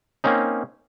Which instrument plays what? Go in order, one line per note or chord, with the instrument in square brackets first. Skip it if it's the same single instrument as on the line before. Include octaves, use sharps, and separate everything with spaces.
[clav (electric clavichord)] A#3 C4 C#4 D#4